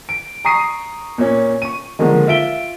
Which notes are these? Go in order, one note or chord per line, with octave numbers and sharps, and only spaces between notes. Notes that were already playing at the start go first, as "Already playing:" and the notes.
D7
A#5 C#6 D#6 C7 D#7
A#2 C#4
C#6 D#7
D3 D#3 F3 G#3 A#3
F4 E5 D7 G7